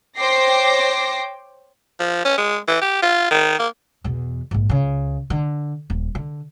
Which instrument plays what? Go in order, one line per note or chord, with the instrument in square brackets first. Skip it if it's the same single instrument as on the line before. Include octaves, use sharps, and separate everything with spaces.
[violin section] C5 C#5 G5 D6 A#6 C7
[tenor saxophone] F3
C#4
G#3
E3
G4
F4
D#3
A#3
[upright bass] E2 B2
A#1 G#2
C#2 C#3
D3
D#1
D3